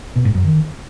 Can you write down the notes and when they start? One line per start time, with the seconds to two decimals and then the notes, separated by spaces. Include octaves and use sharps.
0.16 B2
0.25 G#2
0.35 F#2
0.44 D#3